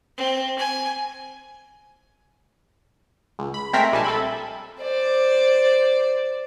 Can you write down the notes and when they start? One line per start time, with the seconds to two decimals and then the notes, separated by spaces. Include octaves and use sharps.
0.18 C4
0.59 G#5
3.39 C#2
3.54 B5
3.73 G#3 A3 C4 A#4 E5 B6
3.92 A#1 G3 G#5 A5
4.04 A4 E5 B5
4.80 C5 D5